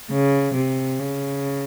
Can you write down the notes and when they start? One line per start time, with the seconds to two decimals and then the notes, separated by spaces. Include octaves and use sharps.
0.11 C#3
0.54 C3
0.98 C#3